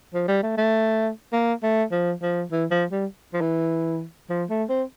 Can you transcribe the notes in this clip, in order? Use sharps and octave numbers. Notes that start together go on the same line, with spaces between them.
F3
G3
A3
A3
A#3
A3
F3
F3
E3
F3
G3
F3
E3
F3
A3
C4